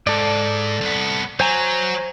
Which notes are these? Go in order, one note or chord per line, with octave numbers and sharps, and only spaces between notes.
G#2 A4 D5
C2 B3
F#3 C5 G#5 A#5